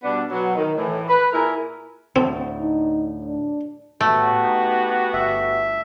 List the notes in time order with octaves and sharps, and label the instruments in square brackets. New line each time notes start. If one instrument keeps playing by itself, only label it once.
[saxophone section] B2 G3 B3 D4
B2 F#3
D#3
A2 E3
B4
A#2 E4 G#4 A#4
[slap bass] D2 A2 [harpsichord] C4
[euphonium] D#4
D4
[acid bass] A2 [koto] A3 [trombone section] B3 F#4 G4
[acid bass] D#4
[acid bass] G1 [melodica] E5